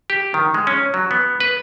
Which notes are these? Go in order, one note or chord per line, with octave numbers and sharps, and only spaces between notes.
G4
D#3
G#3
C#4
F#3
B3
B4